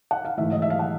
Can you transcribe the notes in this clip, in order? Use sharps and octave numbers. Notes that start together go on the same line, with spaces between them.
F#5
F5
G#2 E3 A3 E5
D#5
E5
F5
F#5